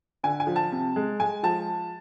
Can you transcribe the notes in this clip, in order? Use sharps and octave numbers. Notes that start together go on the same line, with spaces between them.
D3 G#5
G#5
F3
A5
C3
G#3
G#3 G#5
F3 A5